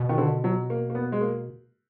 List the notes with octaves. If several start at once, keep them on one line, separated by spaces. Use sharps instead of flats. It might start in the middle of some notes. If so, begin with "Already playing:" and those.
Already playing: B2
D#3
D3
F#3
A#3
A#3
B3
G#3
A#3